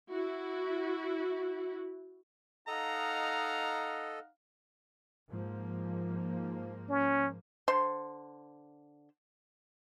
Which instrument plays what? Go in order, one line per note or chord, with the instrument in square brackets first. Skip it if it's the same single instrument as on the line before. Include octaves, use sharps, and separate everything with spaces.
[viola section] E4 F#4
[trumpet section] D#4 F5 F#5 [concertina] A4 D#5 [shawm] A#5
[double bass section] G#2 F3 A#3
[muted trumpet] C#4
[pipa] D3 C5 C6